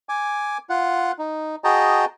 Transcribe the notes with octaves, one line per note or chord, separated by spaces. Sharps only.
G#5 D6
F4 F#5
D#4
F#4 G#4 D#5 G5 A5 A#5